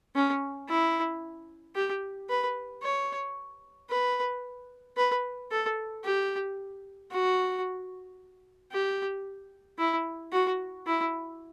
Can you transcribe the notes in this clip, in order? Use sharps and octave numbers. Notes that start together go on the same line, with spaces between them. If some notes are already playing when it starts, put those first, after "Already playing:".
C#4
E4
G4
B4
C#5
B4
B4
A4
G4
F#4
G4
E4
F#4
E4